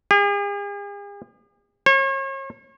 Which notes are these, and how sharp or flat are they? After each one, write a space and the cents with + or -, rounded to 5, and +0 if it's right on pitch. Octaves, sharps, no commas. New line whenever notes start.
G#4 -45
C#5 -40